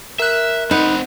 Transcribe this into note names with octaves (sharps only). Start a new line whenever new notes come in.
A#4 E5 F#6
C4 D#4 B4 F#5